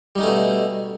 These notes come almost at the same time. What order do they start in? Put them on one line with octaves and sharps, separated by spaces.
G3 D#4 C#4 A3 B2